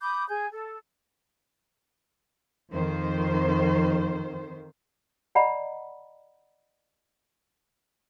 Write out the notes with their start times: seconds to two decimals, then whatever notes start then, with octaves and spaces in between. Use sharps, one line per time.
0.02 B5 D6 D#6 G6
0.28 G#4 G#5 G6
0.52 A4
2.73 F2 D#3 C5
5.35 D5 D#5 F#5 A#5 B5